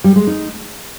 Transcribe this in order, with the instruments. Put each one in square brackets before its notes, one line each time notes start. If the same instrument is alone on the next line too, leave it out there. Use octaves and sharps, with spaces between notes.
[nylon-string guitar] G3
G#3
D#4